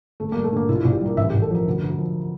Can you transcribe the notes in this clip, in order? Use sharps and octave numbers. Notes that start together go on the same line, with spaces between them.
G1 A3
A#3
G3
A3
D3 A#3
A#1 E4
F4
E4
A#1
G4
G3 A#4
A1 E5
G4
A1
A4
F3 A#4
D2
D2
F3